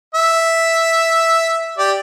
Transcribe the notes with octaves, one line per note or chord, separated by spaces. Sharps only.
E5
G4 D5